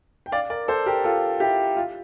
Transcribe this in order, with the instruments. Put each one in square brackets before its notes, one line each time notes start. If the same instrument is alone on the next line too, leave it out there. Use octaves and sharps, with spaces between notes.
[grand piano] G5
D5 F5
A#4 D5
A4 C5
G4 A#4
F4 A4
E4 G4
F4